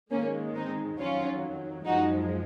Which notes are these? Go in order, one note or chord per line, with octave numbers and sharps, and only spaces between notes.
G#2 D#3 G#3 A#3 C#4
C4 D#4
F2 D#3 F#3 C#4 F4
F#2 F3 G#3 D#4 F#4